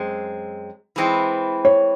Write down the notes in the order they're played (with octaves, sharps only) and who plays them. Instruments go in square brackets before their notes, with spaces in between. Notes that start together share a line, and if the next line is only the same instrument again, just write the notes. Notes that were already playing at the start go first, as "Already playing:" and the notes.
Already playing: [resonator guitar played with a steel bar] F#2 G#3 C4
E3 G#3 C4 E4
[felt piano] C#5